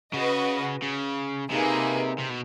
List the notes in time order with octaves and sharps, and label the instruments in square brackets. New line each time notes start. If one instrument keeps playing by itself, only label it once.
[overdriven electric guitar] C#3 [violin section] F#4 B4 D#5
[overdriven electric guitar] C#3
[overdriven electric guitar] C3 [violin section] A#3 D#4 G#4 B4
[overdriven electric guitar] C3
B2